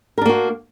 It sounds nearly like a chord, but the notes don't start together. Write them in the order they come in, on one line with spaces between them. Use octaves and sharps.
A#4 D4 A#3 F#4